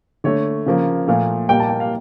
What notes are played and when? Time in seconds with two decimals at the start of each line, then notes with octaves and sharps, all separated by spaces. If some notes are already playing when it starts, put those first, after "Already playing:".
0.24 D3 A3 C#5
0.66 C#3 F3 A#3
1.08 A#2 F3 A3 F5
1.49 A#2 G3 A#3 G5
1.60 A5
1.69 G5
1.80 F5